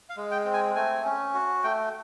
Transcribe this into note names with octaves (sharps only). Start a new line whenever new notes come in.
F5
G#3
G5
C4
G#5
A3 G#5
C#4
F#4
A3 G5